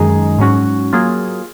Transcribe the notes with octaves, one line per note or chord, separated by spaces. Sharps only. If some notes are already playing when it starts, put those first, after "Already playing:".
Already playing: F#2 D#3 G#3 D#4 G#4
G#2 F#3 C#4 F#4
F#3 A#3 F4 G#4